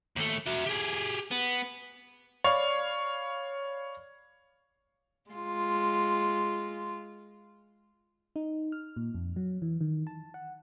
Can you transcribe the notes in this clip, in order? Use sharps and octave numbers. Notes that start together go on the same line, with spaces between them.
D#2 A3
F#4 E5
G4 G#4
B3
C#5 D5 F5 B5
G#3 F4
D#4
F6
A#2
F2
F#3
E3
D#3
A5
F#5